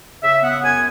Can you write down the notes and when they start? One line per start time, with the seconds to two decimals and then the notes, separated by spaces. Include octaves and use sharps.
0.23 C#3 E5
0.43 B3 F#5
0.63 F#2 G#5